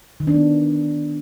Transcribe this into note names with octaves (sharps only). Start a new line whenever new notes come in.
D#3
D4
B3